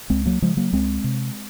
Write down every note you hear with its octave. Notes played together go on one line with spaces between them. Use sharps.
C#2 G#3 C4
F#3 A#3
C#3 F3 G#3
F#3 A#3
C#2 G#3 C4
C3